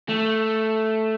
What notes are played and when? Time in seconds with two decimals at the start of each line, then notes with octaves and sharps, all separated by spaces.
0.08 A3